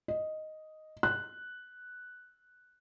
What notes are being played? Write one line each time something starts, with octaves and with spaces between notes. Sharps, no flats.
D#5
F#6